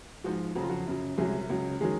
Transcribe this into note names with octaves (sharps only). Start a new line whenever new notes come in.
G#2 F3 G#3 F#4
F2 C#3 F#3 F#4
F4
F#4
F#2 C#3 F#3
C2 C3 F#3 G#3 G#4
C#2 C#3 F#3
D#3 F#3 G#3 G#4